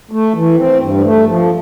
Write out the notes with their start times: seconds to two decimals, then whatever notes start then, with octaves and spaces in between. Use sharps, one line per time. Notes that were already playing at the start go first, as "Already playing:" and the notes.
0.11 A3
0.35 E3
0.57 C4
0.80 G2
1.04 A3
1.26 F3